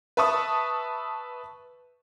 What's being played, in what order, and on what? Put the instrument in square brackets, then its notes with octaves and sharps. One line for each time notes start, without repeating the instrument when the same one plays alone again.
[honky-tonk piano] B4 E5 A5 C#6 D#6